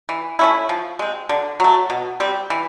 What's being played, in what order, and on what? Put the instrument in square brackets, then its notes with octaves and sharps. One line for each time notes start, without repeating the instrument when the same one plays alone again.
[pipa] E3
A3 C#4 E4
F3
G#3 C4
D3
F#3 A3
B2
G3 C4
E3